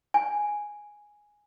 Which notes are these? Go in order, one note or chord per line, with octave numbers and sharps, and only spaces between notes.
G#5